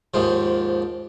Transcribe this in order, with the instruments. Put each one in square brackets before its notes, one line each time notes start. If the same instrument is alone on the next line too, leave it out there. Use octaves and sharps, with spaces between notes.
[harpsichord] D#2 G#2 F3